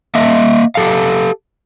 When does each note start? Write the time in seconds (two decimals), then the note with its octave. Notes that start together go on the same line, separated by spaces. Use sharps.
0.15 A#3 D#5 E5
0.75 G4 A4 F5